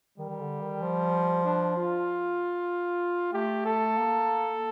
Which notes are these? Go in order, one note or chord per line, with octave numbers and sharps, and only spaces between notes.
D#3 G3
D#3
D3
D#3
F3
D4
F4
A3 G4
A4
A#3